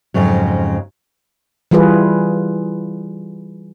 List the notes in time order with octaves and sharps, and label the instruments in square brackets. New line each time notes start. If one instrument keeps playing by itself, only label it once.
[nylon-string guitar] F2 G#2 C#3 F#3
[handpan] E3 G3 F4 G#4 B4